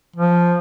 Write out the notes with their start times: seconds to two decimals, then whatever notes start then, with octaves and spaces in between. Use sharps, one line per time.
0.16 F3